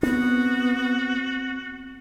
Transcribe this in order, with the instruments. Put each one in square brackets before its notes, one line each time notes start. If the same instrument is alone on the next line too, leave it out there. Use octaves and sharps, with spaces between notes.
[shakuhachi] B3 [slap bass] C4 D4 [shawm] F#4